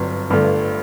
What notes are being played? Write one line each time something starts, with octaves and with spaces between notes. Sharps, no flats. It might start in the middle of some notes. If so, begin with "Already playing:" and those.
Already playing: G1 G2 F#3 C4
G1 G2 D3 A3